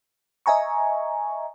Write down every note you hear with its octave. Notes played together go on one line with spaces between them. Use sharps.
D#5 E5 G#5 A#5 C#6